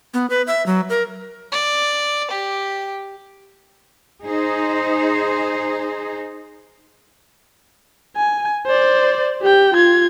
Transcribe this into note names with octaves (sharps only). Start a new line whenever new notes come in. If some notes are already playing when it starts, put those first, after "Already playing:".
B3
B4
E5
F#3
A#4
D5
G4
D#4 G#4 C5
G#5
C5 D5
G4 G5
F4 G#6